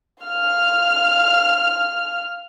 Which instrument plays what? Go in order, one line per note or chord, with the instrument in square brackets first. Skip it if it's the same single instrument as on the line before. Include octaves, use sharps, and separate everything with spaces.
[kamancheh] F5 F6